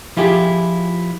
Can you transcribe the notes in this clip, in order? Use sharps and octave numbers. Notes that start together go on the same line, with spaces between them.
F3 E4 F4 G4 G#4